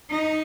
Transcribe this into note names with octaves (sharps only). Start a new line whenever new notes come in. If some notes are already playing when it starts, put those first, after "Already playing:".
D#4